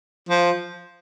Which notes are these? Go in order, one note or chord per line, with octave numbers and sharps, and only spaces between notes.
F3